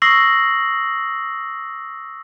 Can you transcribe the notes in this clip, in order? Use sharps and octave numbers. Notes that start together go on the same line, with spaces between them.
C#6 D#6 E6 A#6 C7 F#7